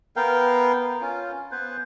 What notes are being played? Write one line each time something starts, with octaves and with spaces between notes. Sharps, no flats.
B3 A#4 F5 G5
C#4 F4
B3 B4 C5